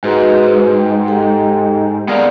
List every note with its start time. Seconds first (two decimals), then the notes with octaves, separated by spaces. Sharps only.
0.04 G#2 F#4 G#4 B4
0.77 G5
1.08 G4 A4 G5
2.08 B3 G#4 A#4 D5 F5